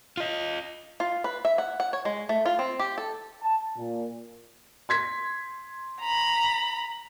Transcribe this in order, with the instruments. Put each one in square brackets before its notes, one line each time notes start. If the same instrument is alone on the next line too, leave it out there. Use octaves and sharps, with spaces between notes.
[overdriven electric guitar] F4 D#5
[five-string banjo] F4
B4
E5
F#5
F#5
C#5
G#3
A3
F4
C4
G4
A4
[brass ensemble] A5
A#2
[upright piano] C6 G#6 B6
[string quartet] A#5 B5